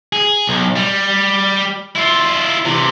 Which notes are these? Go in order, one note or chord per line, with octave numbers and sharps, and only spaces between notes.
G#4
B1
G3
E4 F4
C3 E3